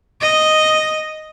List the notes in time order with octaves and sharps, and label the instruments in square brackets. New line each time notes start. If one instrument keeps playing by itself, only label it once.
[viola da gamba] D#5